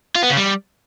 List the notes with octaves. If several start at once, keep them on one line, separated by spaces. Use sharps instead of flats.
F4
B3
C#3
G3